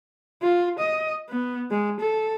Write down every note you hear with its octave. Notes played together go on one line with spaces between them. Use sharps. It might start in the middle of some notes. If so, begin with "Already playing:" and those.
F4
D#5
B3
G#3
A4